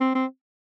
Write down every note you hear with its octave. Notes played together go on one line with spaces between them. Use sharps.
C4
C4